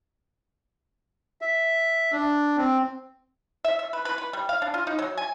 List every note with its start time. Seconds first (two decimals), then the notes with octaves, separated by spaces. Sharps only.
1.41 E5
2.12 D4
2.57 C4
3.65 E5
3.79 E5
3.93 B4
4.05 B4
4.18 B4
4.33 G3
4.49 F5
4.62 D4
4.74 F4
4.87 D#4
4.99 F#3
5.17 G#5